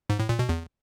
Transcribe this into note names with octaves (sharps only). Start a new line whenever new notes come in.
G#2
A2
A#2
B2
E2